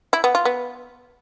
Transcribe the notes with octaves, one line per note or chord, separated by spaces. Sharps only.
E4
B3
F4
B3